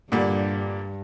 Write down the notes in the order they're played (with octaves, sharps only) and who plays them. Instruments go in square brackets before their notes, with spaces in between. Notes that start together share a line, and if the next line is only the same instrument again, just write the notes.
[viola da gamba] G2 [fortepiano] A#2 D3 G3